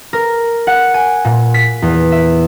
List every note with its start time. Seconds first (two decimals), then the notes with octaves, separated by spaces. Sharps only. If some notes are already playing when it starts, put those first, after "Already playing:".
0.13 A#4
0.67 F#5
0.94 G#5
1.25 A#2
1.54 B6
1.82 E2
2.12 E5